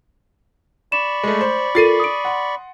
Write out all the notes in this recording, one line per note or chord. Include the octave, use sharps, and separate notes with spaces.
D5 B5 C#6 E7
G#3 A3
C5
F4 A4 A#4 A6 C7 D#7
D#6 D7
F#5 C6